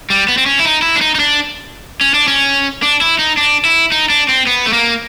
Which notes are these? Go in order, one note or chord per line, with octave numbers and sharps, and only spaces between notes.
G3
B3
C4
C#4
E4
D#4
E4
D4
D#4
D#4
D4
C#4
D4
C#4
D4
E4
D#4
D4
E4
D#4
D4
C4
B3
A3
A#3